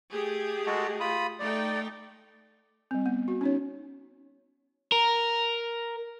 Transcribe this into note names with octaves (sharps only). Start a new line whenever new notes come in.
A3 G4 G#4
G#3 F#4 A4
F4 B5 D#6
A3 D#4 D5 G5
G3 C4
B3
F#4
C#4 D#4 C#5
A#4